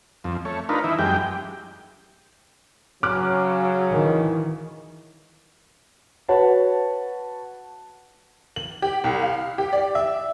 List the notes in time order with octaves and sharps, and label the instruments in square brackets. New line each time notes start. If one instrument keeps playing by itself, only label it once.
[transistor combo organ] F2
A3 C#5
D4 D#4 F4 A#4 B4
E3 D#4 E4
F#2 G#3 G4 G5
[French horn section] C#3 [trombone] F#3 [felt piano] D6 F6 F#6
[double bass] D#3 E3
[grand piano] F#4 B4 C#5 F#5 A5
[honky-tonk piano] F#7
G4
C2
F5
G4
D5
E5